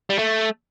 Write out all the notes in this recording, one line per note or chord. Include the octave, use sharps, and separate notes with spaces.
G3
A3